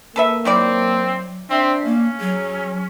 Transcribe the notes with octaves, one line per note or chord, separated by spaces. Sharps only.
A#3 A4 B4 E5
D#3 F#3 C4 E4 D5
C4 D4 E5
A#3 C#4
F#3 G#4